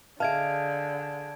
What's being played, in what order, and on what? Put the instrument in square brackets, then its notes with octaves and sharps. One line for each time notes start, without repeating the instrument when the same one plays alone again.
[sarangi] D3 [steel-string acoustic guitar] G#4 D#5 F5 [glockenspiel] A5 G#6 D7